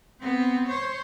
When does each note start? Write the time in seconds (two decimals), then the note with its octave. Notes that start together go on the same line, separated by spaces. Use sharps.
0.20 B3 C4
0.68 C5 C#5